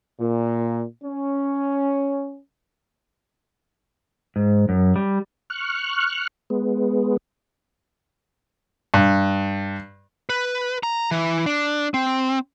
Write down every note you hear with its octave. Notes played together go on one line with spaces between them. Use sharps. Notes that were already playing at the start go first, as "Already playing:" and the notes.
A#2
C#4
G#2
F#2
G3
C#6 F6 F#6
G#3 B3
G2
B4
A#5
E3
D4
C4